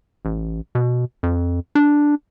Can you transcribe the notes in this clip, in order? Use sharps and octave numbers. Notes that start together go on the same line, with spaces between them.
A1
B2
F2
D4